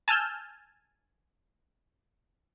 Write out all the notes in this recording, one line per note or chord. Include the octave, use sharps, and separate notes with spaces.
G#5 A5 E6 F6 G6